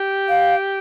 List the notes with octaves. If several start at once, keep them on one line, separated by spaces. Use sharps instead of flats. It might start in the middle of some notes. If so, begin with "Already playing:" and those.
Already playing: G4
F5